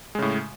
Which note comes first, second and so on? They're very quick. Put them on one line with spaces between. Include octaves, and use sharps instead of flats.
G#3 C#3 A2